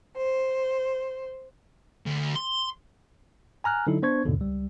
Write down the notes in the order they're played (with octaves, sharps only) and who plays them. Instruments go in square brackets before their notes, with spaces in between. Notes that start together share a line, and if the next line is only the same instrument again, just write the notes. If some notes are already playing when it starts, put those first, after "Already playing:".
[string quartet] C5
[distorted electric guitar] D2
C6
[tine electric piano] G#5 A#5 F6 F#6
D3 F#3 D#4 E4 A4
B3 D4 C5 C#6 G#6
D#2 G#2 B2 D3
C#2 G3